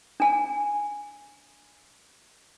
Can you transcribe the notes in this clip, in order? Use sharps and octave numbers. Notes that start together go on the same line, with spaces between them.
D4 G#5